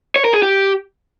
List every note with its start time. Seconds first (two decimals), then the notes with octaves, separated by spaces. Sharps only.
0.16 C#5
0.25 A#4
0.34 G#4
0.42 G4